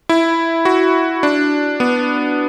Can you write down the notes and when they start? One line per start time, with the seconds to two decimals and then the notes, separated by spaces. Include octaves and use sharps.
0.09 E4
0.65 F#4
1.23 D4
1.80 B3